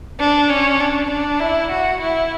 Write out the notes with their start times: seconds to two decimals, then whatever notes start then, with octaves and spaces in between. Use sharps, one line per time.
0.20 D4
0.50 C#4
0.80 D4
1.10 D4
1.40 E4
1.71 F#4
2.00 E4